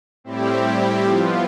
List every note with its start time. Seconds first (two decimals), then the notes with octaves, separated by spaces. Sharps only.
0.24 A2 G3 C4 E4 G4
1.04 F3 B3 F4